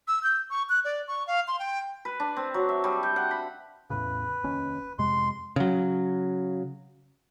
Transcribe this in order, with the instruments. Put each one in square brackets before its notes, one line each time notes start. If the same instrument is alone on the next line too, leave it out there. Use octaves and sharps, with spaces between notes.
[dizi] E6
G6
C#6
F#6
D5
C#6
F5
C6
G5
[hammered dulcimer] B4
D4
C4
F#3
E5
G3
G5
F#5
B5
[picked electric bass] E2 A2 C#3 [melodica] B4
[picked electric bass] F1 D#2 C#4
[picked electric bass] F2 C3 G#3 [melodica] C6
[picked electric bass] C#3 F#3